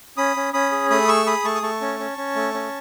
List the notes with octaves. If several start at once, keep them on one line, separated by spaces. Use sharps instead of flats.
C#4 B5 D#6
C#4
C#4 B5 D#6
G#4
A3 B5 D#6
G#4 C#6 E6
G#4 B5 D#6
A3 A5 C#6
D#6
A3 A5 C#6
C#4
C#4
C#4
A3
C#4